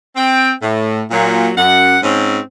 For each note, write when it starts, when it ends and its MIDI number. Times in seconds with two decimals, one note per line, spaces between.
0.16 0.51 60
0.16 0.51 79
0.62 1.01 45
1.11 1.50 46
1.11 1.50 54
1.57 1.97 42
1.57 1.97 78
2.03 2.40 44
2.03 2.40 60
2.03 2.40 61